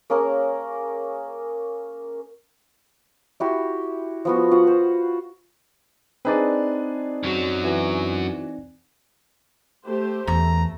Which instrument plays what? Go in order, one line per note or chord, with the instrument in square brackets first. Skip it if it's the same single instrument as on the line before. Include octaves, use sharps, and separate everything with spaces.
[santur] A#3 C#4 G#4 A#4
E4 F#4 G4 C6
F3 B3 F#4
F4 F#4 F#5
C5
[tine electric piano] C4 D#4 D5 [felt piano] D4 G#4 B4
[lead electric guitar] F#2 F#3
[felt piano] E3 F#4
[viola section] A3 G4 C5
[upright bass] E2 [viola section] A3 [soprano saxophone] A#5